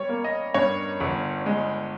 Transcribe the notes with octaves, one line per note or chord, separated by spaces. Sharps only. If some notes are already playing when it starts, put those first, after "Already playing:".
Already playing: G3 C#5
A#3
D#5
G2 C#5
G1
G#3